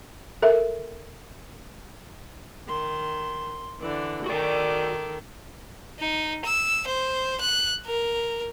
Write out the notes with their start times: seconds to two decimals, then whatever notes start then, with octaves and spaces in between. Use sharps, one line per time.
0.42 A4 A#4 E5
2.68 D#3 C6
3.80 D3 E3 D5
4.26 D#3 F#4 A4 D5 D6
6.00 D#4
6.45 E6
6.87 C5
7.41 F#6
7.86 A#4